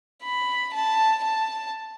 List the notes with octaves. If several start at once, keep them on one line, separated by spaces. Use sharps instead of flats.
B5
A5
A5